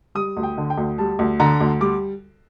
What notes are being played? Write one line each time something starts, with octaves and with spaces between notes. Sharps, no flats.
G3 D#6
D2
G5
D3
G5
D2
G3 A5
D2
D3 A#5
D2
G3 D6